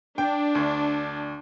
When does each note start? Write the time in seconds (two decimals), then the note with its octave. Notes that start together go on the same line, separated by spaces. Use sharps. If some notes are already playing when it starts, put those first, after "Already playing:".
0.18 D4 G5
0.55 D2